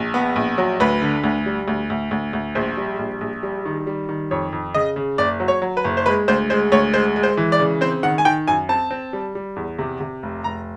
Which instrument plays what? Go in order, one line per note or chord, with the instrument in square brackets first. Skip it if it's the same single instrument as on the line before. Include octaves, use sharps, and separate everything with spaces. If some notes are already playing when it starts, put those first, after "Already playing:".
Already playing: [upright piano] A#1
B3
A#1
F#3
D2 B4
D3
D2
G3
D2
D2
D2
D2
A#1 C5
G3
A#1
A#1
G3
D#3
G3
D#3
F2 C#5
F2
C#3 D#5
C#3
F#1 D5
F#3
C#5
F#3
B4
F#1
C5
G#3 B4
D2 C5
G#3 C5
D2 C#5
G#3 C5
G#3
C5
E3
D5
C#3
C4 C5
D#3 F#5
G#5
D#3 G5
F#2 G#5
C4 A5
C4
G3
G3
E2
C3
C3
F1
F1 A#5